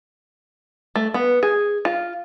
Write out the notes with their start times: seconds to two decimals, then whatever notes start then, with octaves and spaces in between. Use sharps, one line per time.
0.95 A3
1.14 B3
1.43 G#4
1.85 F4